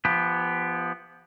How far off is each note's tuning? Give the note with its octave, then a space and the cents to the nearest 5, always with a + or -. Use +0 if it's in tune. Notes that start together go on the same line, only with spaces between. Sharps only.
F3 -25 B3 +0 G4 +20